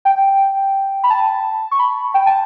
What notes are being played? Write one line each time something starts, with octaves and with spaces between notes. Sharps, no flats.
G5
B5
A5
C#6
B5
G5
A5